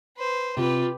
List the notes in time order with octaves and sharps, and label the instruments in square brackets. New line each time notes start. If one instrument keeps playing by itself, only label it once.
[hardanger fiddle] B4 C5
[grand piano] C3 [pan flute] F4 [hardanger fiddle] G4 B4